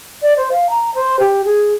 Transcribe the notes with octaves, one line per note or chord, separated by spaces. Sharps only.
D5
C5
F5
A#5
C5
G4
G#4